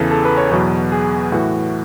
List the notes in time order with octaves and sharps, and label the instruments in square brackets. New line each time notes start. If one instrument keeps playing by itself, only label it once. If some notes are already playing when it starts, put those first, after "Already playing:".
Already playing: [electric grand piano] E2 C#3 E3 A4
A4
B4
C#5
E2 B2 F#3 B4
G#4
A2 E3 F#4